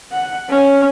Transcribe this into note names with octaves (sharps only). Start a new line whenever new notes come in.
F#5
C#4